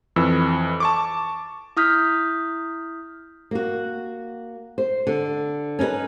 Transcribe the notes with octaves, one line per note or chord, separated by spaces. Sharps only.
F2 E3 E6
A5 C#6 D6
E4 D#6 F6 G6 B6
A#3 F#4
C5
D3
C#4 D#4 E4 B4